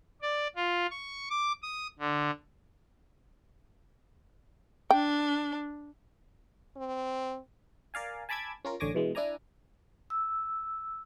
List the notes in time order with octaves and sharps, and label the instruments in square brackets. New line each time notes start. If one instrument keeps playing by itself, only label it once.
[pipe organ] D5
F4
C#6
D6
D#6
D3
[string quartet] D4 [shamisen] G5
[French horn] C4
[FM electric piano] A#4 D5 F5 G#5
G#5 A5 B5 D6 E6 G#6
C#4 F4 A#4
A1 D3 C#5 G#5 D6 A#6
B2 E3 G#3
D4 E4 D5 G#5 A#5
[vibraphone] E6